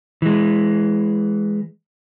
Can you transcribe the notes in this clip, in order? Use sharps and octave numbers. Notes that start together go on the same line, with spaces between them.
E3 G#3